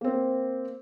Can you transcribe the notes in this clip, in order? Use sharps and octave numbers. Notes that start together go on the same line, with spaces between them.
A#3 C4